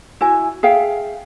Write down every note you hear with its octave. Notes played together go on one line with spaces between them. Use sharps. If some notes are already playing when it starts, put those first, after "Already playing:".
E4 F#4 G#5
G#4 E5 F5 G5